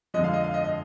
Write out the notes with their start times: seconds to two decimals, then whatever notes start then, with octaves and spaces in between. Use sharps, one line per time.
0.14 F2 D3 F3 G#3 D#5
0.24 F5
0.34 D#5
0.44 F5
0.54 D#5
0.64 D#5